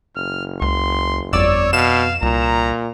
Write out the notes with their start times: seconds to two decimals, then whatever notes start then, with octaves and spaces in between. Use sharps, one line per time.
0.16 F#1 F6
0.62 C#2 C6
1.33 G1 F2 C#5 D5 E6
1.73 B2 F5 E7
2.22 C2 A#2 A#5